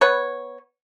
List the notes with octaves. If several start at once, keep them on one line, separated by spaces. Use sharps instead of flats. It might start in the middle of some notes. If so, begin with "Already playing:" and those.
B3 B4 C#5